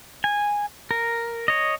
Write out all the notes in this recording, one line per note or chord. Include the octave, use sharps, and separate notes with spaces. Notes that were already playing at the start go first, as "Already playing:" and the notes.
G#5
A#4
C#5 D#5